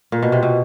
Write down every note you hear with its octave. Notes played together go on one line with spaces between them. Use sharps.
A#2
B2
C3
B2